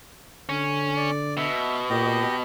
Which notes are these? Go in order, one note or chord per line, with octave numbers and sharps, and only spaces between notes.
D3 C#4
D5
B2 E5
A#2 G4 D#5